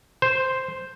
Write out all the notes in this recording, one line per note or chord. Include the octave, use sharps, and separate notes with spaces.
C5